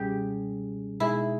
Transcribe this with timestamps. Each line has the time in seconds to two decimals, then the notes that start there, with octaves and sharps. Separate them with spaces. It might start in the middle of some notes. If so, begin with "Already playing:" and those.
Already playing: C#2 B2 G3 C#4 G4 G#4
1.00 B2 G#3 D#4 E4 G#4